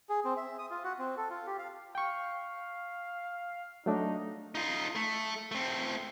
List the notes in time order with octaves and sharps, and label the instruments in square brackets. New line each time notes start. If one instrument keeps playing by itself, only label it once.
[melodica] G#4
C4
E5
D#6
F4
F#4
C4
A4
F4
G4
F5
[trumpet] F5 [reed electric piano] G5 C#6
[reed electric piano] F#3 A3 D4 [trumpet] D#4
[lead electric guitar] D#4 F4
A3
A3 C4